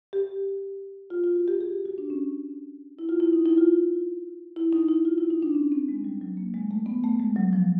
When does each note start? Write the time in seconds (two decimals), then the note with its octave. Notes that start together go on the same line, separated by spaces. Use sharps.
0.13 G4
1.10 F4
1.24 F4
1.36 F#4
1.48 G4
1.61 G#4
1.73 G4
1.86 F#4
1.98 D4
2.10 C#4
2.99 E4
3.09 F4
3.20 E4
3.33 D#4
3.46 E4
3.58 F4
4.56 E4
4.73 D#4
4.89 E4
5.05 F4
5.18 E4
5.30 D#4
5.42 D4
5.55 C#4
5.72 C4
5.88 G#3
6.05 G3
6.21 F#3
6.37 A#3
6.54 G#3
6.71 A3
6.86 B3
7.04 A3
7.20 G#3
7.36 F#3
7.53 F3